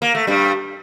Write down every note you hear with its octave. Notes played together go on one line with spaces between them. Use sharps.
A#3
A3
G2 G3